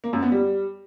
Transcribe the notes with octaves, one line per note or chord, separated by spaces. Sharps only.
A#3
F#2
B3
G3